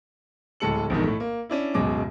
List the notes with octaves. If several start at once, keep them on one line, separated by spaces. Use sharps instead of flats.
D1 A2 G#3 A4 C#7 F#7
A#1 E2 G#2 B2 D3 D#3
A2 A3
A#3
C#4 D4 E4
D1 F#2 B2 G#3 D6